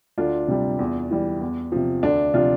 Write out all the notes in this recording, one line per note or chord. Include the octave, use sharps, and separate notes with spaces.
D2 D4 F4
C3 G3
E2
E3 G3
E2
C3 F3
D2 D4
C3 F3 D4 F4